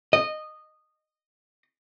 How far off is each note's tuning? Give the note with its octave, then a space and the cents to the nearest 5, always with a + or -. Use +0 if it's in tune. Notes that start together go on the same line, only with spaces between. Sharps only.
D#5 -15